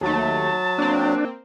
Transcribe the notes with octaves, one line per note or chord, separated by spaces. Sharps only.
D#2 F#3 A3 A5
A#3 C4 D4